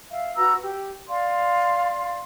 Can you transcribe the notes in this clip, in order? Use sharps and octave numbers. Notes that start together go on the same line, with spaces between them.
E5 F5
F#4 B4 A#5 E6
G4
D5 F5 C6